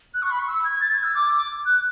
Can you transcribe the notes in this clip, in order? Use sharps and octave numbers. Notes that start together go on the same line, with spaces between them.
F#6
C#6
B5
C#6
E6
G#6
A6
G#6
E6
D6
F#6